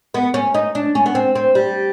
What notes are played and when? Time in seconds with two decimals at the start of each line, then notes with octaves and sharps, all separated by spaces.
0.14 B3
0.34 C#4
0.54 D#4
0.75 D4
0.95 C#4
1.06 B3
1.15 C4
1.35 C4
1.55 G3